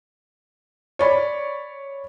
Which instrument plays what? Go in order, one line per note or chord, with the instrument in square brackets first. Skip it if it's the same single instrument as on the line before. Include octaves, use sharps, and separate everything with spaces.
[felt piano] C#5 D5 B5